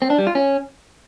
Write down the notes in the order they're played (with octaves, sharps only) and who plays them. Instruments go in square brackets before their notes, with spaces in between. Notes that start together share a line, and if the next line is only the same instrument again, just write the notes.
[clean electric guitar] C4
D4
G3
F4
C#4